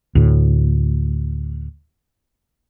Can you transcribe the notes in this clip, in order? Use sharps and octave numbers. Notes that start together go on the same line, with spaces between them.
D2 A2